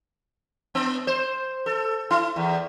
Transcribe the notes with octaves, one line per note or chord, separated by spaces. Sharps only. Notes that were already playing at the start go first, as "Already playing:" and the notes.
B3
C5
A4
E4
E2